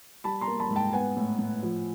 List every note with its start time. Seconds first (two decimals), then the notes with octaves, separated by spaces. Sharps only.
0.24 G3 A5 B5
0.41 A#5 C6
0.47 A#3
0.60 A5 B5
0.70 G#2
0.76 G5 A5
0.93 B3 F#5 G#5
1.17 A2
1.39 A2
1.63 F3